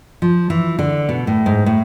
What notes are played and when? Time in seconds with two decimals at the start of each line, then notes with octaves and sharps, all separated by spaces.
0.22 F3
0.50 E3
0.79 D3
1.09 B2
1.27 A2
1.46 G#2
1.66 A2